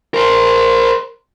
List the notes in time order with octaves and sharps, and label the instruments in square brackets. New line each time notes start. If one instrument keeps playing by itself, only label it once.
[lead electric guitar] A#4 C5